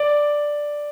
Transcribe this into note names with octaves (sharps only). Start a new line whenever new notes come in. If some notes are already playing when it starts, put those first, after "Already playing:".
Already playing: D5